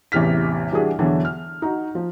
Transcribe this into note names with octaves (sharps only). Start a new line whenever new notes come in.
A1 E2 C3 F6 B6
E3 G3 D4 F#4 G#4
E2 B2 D3 E3 F#3
F6
D#4 F#4
F3